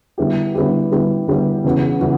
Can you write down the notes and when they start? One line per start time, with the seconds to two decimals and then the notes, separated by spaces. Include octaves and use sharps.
0.18 D3 G3 B3 E4 G4
0.54 D3 G3 B3 E4 G4
0.91 D3 G3 B3 E4 G4
1.28 D3 G3 B3 E4 G4
1.64 C#3 E3 B3 F#4
2.01 C#3 E3 B3 F#4